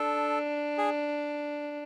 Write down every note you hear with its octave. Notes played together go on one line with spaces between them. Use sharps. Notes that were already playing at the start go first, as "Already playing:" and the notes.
Already playing: D4 A4
G#4